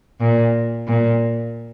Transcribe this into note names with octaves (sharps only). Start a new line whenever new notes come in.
A#2
A#2